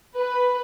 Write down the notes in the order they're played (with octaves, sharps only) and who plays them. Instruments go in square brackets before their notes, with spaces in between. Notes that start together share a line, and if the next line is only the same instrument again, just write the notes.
[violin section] B4